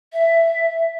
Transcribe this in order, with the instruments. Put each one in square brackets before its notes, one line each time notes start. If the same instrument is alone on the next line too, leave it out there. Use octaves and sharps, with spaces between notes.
[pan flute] E5